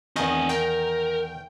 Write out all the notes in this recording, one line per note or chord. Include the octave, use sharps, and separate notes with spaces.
E2 D#3 C4 D#5 G#5
A#4 G5